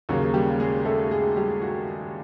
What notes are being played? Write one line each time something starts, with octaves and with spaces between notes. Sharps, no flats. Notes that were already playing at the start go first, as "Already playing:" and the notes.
D#2 C#3 F#3 A#3 F#4
G3 G4
G#3 G#4
A3 A4
G#3 G#4
G3 G4
F#4